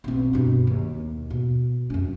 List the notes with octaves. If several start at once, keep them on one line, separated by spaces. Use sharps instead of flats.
B1 C4
G2 B2
D#2
B2
F#2 C#4